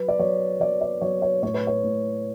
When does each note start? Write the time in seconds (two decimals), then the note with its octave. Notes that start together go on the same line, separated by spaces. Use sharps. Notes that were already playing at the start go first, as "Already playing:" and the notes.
Already playing: F#3 B4
0.08 D5
0.19 F#3 C#5
0.60 F#3 D5
0.81 D5
1.01 F#3 C#5
1.22 C#5
1.42 A2 C#5
1.54 B4
1.67 C#5
1.84 A2